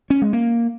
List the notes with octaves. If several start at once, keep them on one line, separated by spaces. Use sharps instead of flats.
C#4
G#3
A#3